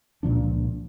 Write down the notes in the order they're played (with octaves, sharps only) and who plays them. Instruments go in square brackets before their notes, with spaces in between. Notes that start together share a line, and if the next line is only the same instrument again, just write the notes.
[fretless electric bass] C#2 A#2 F3 D4